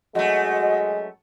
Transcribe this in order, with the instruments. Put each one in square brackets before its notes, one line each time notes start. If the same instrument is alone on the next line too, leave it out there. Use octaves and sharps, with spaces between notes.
[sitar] F#2 A3 [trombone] G#3 [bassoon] F#4 [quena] D#5